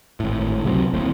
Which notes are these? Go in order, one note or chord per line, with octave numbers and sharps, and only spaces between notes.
G#1 A2
C#2 C3 F#3 C4
D1 D#2 A2 C4